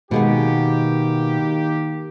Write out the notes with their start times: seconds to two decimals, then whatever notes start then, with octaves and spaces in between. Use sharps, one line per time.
0.11 B2 D#3 G#3 A#3 B3 G4